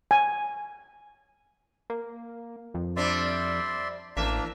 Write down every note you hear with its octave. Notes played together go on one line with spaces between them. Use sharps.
G#5
A#3
F2
G3 C4 D4 D5 E5 C6
A1 E3 A#3 D4 E5 A#5